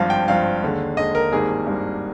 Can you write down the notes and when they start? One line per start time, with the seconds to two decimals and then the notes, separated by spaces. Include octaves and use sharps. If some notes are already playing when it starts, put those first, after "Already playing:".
Already playing: G#1 G2 F3 F5
0.10 G5
0.27 G#1 G2 F3 F5
0.62 D#2 D3 G#3
0.97 D#2 D3 G#3 D#5
1.15 A#4
1.32 G#1 G2 D#3 G3 A#3 G#4
1.67 G#1 G2 D#3 G3 A#3